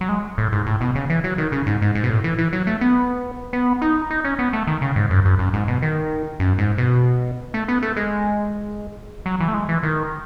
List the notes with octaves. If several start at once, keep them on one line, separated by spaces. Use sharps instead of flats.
F#3
G#3
A2
G#2
A2
B2
C#3
E3
F#3
D#3
C#3
G#2
G#2
G#2
B2
A2
E3
E3
F#3
A3
B3
B3
D#4
D#4
C#4
B3
A3
D#3
C#3
G#2
F#2
F#2
F#2
G#2
B2
D#3
F#2
G#2
B2
A3
B3
A3
G#3
F#3
E3
A3
G#3
E3
D#3